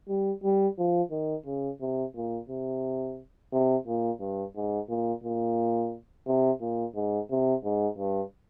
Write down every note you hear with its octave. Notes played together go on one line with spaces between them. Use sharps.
G3
G3
F3
D#3
C#3
C3
A#2
C3
C3
A#2
G2
G#2
A#2
A#2
C3
A#2
G#2
C3
G#2
G2